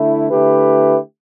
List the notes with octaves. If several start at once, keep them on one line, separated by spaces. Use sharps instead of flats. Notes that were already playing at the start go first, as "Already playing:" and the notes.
Already playing: D3 A3 E4
D3 A3 E4 G4 B4